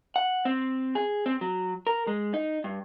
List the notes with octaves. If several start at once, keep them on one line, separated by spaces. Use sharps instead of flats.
F#5
C4
G#4
C4
F#3
A#4
G#3
D#4
G2